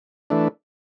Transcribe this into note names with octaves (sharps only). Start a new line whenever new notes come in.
E3 A3 D4